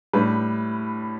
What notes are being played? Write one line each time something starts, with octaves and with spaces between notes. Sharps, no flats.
A2 G3 B4